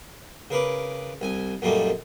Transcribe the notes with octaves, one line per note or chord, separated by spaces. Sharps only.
C#3 A#4 B4 D6
C2 G#5
F#2 A#2 G3 A3 A#3 D#4